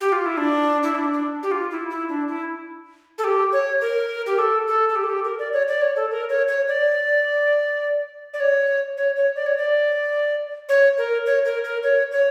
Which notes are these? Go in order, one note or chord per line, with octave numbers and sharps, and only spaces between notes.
G4
F4
E4
D4
E4
D4
D4
G4
F4
E4
E4
D4
E4
A4
G4
C#5
A#4
G4
A4
A4
A4
G4
A4
G4
A#4
D5
C#5
D5
C#5
A4
A#4
C#5
C#5
D5
D5
C#5
C#5
C#5
D5
C#5
D5
C#5
A#4
C#5
A#4
A#4
C#5
C#5